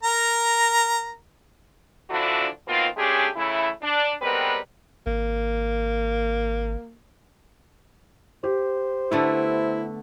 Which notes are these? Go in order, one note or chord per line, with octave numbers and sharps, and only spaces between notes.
A#4 A#5
D3 E3 F3 D4 E4 F#4
B2 D#3 A#3 C4 F4
G#3 A3 C#4 D4 G4 G#4
C#3 E3 A3 E4
D4
G3 G#3 B3 C4 A#4 B4
G#1 A#3
G4 C5
D3 A3 B3 E4